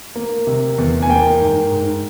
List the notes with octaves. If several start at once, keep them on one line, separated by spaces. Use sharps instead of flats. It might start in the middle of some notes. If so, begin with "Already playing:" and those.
A#3
C3
E2
G#5
A#3 G5
G#2
G#2